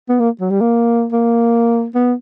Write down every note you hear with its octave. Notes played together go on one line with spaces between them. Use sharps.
B3
A#3
F#3
G3
A#3
A#3
B3